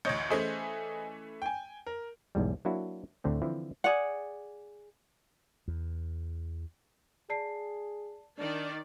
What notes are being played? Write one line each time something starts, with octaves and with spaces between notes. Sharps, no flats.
A1 D2 C#5 D#5 G6
E3 A3 C#4 G#4 C5 D#5
G5 G#5
A#4
B1 E2 G#2 G3
F#3 A#3 D4 E4 F#4
D2 A2 D3 A3 C4
D3 E3 F3 C4 E4
G#4 D5 F#5
E2
G#4 D5 A5 C7
D#3 D4 D5